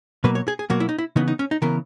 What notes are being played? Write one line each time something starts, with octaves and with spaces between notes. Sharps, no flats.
B2 F#3 A#3 B4
C#5
G#4
G#4
B2 F#3 A#3 F#4
E4
D#4
E4
C#3 E3 B3 D#4
D#4
C#4
D#4
C#3 E3 B3 A#4